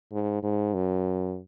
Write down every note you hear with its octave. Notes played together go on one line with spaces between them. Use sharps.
G#2
G#2
F#2